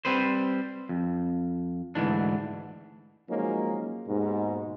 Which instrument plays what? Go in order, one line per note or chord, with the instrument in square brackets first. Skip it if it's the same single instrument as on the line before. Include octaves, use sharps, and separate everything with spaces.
[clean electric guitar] G3 C4 B4 C5
F2
D2 G#2 E3 D4
[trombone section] F3 F#3 G#3 A#3 C#4 D#4
D#2 G#2 B2